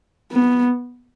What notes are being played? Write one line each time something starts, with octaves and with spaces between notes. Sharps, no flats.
B3